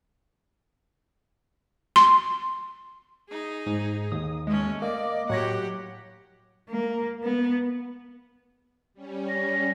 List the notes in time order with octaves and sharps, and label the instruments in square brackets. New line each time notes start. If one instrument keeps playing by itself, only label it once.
[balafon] C6
[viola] D#4 G#4
[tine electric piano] G#2
[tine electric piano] D#2 [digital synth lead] D#6
[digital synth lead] G#3 [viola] A3 C#4
[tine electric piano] A#3 [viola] D5 [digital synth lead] D#5
[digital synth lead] A2 [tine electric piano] F#3 C#5 A#6 [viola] G4 F#5
[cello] A#3
B3
[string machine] G3 C#4
[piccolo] A#6